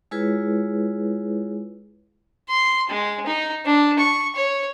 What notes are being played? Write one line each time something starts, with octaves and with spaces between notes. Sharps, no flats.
G#3 E4 F4 G#4 B4 C#5
C6
G#3
D#4
D4
C#6
C#5